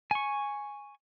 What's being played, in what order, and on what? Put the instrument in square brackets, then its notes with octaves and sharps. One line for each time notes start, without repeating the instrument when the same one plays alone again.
[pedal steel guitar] G#5 C#6